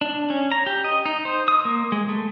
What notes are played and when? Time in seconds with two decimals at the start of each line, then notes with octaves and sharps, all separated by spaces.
0.01 D4
0.30 C#4
0.52 A#5
0.66 G4
0.84 D#5
1.06 D#4
1.25 C5
1.48 D#6
1.65 A#3
1.92 G#3
2.09 A3